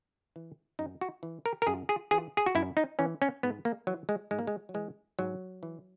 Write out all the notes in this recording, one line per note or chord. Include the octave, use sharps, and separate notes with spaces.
E3
F#2 D#4
F#4
E3
A#4
A#4
F#2 G#4
G#4
E3 G#4
G#4
F#4
F#2 E4
D#4
E3 C#4
C#4
G#2 B3
A#3
E3 F#3
G#3
G#2 G#3
A#3
G#3
F#3
E3 G#3
G#2 F#3
E3